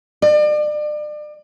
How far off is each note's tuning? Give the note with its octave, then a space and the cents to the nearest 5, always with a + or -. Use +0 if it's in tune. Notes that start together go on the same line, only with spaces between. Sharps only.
D5 +35